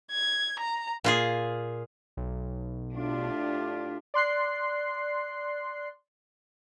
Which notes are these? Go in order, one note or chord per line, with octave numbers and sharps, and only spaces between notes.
G#6
A#5
A#2 F4 G#4
B1
A2 A3 D4 F4 G4
D5 C6 F#6 C7